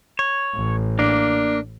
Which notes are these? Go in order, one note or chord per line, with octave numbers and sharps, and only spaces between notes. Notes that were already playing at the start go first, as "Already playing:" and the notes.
C#5
A1
A#3 D4